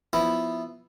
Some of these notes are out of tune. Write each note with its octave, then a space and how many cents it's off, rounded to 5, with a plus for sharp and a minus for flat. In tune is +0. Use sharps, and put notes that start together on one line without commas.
F3 +0 B3 +0 E4 +0